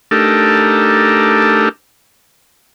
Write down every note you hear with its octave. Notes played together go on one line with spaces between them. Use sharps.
A3 D4 D#4 G4 A4 A#4